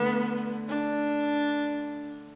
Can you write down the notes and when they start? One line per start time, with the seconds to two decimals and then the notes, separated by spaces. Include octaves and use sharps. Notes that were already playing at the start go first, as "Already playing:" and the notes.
Already playing: D3 A3 B3
0.68 D4